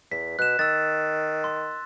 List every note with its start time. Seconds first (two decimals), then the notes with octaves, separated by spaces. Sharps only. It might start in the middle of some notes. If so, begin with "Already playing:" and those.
0.12 E2 B6
0.39 B2 F#6 E7
0.59 D#3 E6 A6
1.44 C6